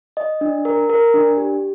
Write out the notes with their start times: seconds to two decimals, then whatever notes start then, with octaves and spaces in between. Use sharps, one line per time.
0.17 D#5
0.41 D4
0.65 A#4
0.89 A#4
1.14 D4
1.37 G4